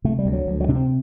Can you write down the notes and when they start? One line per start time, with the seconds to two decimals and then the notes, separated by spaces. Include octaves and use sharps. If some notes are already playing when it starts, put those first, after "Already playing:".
0.04 C3 A3
0.19 G3
0.26 D2
0.33 F#3
0.47 D2
0.60 F#3
0.68 C3 D4
0.75 C4